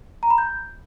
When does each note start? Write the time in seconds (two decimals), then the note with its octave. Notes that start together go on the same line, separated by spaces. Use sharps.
0.23 A#5
0.30 B5
0.38 G6